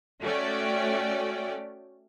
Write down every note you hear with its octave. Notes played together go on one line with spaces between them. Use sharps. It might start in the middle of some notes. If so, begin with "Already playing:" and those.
A3 C#4 F#4 D5 G5